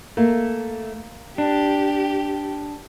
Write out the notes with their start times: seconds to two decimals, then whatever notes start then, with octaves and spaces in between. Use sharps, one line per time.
0.17 A3 A#3
1.38 D4 G4